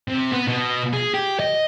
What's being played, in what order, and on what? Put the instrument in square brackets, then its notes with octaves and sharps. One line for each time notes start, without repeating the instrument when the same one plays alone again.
[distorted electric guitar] C3
B3
B2
G#4
G4
D#5